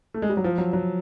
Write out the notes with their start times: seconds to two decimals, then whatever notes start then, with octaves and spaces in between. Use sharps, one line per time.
0.14 A3
0.22 G#3
0.29 G3
0.37 F#3
0.44 F3
0.58 F#3
0.73 F#3